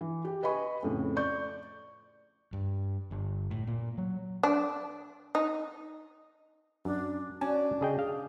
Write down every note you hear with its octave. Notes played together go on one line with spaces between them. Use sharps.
E3
G4
B4 D#5 G#5 B5 C#6
F2 A2 C#3
D5 C#6 G6
G2
G1
A2
A#2
F#3
D4
D#4
F#2 D4
C#4 D4 F#4 G#5 A5
C#3 G#4 D#5 G5
G#4 F5